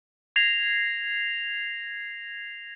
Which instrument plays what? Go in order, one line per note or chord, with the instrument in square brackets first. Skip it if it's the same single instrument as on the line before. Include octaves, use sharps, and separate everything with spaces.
[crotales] G#6 A#6 C7 F7